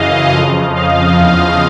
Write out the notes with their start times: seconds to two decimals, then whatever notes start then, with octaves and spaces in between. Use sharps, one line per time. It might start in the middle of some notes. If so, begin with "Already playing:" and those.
Already playing: F#2 C#3 E3 D#5 F5
0.33 F2 C#3 F3
0.75 D#5 F5
1.18 E2 C#3 F3